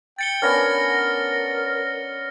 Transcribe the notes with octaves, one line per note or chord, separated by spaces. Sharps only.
G5 A6 C#7 G7
B3 C#4 D4 A#4 F6 A#6